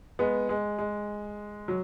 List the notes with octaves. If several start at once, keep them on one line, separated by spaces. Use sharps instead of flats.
G#3 B3
G#3
G#3
F#3